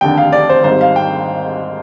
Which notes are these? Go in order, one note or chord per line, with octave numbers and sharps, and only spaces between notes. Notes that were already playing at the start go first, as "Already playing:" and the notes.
F1 D#2 D3 G5
F5
D5
C5
G#1 G#2 G3 C5
F5
G5